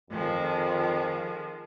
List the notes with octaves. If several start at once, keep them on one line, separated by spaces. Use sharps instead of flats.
F2 D#3 F3 G#3